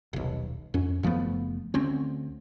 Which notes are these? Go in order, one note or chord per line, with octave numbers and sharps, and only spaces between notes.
D#1 B1
F2 C#4
F#1 F3 A3 B3
D2 C4 C#4